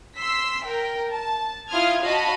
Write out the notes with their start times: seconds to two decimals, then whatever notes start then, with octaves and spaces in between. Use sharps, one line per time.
0.17 C6 E6 B6
0.63 A#4 G5
1.10 A5
1.70 E4 F4 C6 D#6 F6 G#6
2.02 F#4 D#5 F5 A5 B5